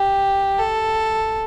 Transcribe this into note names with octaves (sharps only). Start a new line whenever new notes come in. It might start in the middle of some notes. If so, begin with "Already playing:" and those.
Already playing: G4
A4